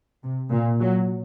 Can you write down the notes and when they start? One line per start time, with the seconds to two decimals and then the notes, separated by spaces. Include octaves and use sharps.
0.22 C3
0.51 A#2
0.80 F#3